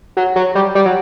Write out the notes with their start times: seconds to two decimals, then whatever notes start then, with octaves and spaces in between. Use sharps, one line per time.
0.17 F#3
0.36 F#3
0.55 G3
0.75 G3
0.86 F#3